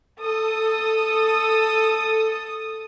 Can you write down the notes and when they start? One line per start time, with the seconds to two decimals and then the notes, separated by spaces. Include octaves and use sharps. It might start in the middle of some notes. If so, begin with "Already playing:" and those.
0.20 A4 D#6